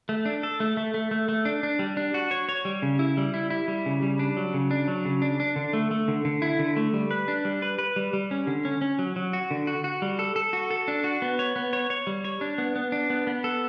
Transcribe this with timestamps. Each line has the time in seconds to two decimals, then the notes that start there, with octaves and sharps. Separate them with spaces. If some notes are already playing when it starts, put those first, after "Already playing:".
0.09 A3
0.25 D4
0.43 A4
0.60 A3
0.77 A3
0.94 A3
1.11 A3
1.29 A3
1.45 D4
1.63 D4
1.79 G3
1.97 D4
2.14 F#4
2.31 C#5
2.49 C#5
2.65 G3
2.82 C#3
2.99 E4
3.17 G3
3.34 E4
3.50 E4
3.68 G3
3.86 C#3
4.02 G3
4.19 D4
4.37 F#3
4.54 C#3
4.71 D4
4.88 F#3
5.05 C#3
5.22 D4
5.40 D4
5.56 D3
5.73 A3
5.91 A3
6.08 D3
6.25 D3
6.42 E4
6.59 D3
6.77 A3
6.94 G3
7.11 B4
7.28 D4
7.45 G3
7.62 B4
7.79 B4
7.96 G3
8.13 G3
8.31 C#4
8.47 D3
8.65 C#4
8.82 C#4
8.99 F#3
9.16 F#3
9.33 F#4
9.51 D3
9.67 F#4
9.84 F#4
10.02 G3
10.19 A4
10.36 A4
10.53 F#4
10.71 A4
10.88 D4
11.04 F#4
11.22 B3
11.39 C#5
11.56 B3
11.73 C#5
11.90 C#5
12.07 G3
12.25 C#5
12.41 D4
12.58 B3
12.76 B3
12.92 D4
13.10 B3
13.27 B3
13.44 A4